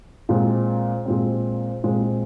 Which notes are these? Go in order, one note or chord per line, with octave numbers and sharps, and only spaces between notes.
A#2 G#3 C4
A#2 G#3 C4
A#2 G#3 C4